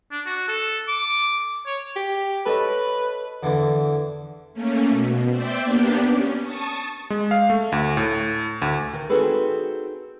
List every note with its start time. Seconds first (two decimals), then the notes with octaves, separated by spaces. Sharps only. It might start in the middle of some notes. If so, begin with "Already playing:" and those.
0.12 D4
0.26 F#4
0.48 A4
0.88 D6
1.66 C#5
1.96 G4
2.46 A4 B4 C#5 D#5
3.43 E2 D3 E3
4.54 A3 A#3 C#4
4.89 B2
5.30 C5 D5 E5 G5
5.63 A#3 B3 D4 G4
6.09 C#4
6.43 A5 C#6 D#6
7.10 G#3
7.31 F5
7.50 A3
7.72 D2
7.97 A2
8.62 D2
8.93 D#3
9.09 C4 D#4 F#4 G#4 A4 B4